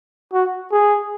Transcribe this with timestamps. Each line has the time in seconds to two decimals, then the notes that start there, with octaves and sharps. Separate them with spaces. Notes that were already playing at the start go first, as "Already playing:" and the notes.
0.33 F#4
0.72 G#4